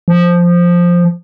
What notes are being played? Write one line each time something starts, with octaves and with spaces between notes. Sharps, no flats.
F3